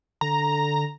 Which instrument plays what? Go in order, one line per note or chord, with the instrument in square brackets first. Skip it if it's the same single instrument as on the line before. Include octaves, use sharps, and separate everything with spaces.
[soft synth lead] D3 [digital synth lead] A#5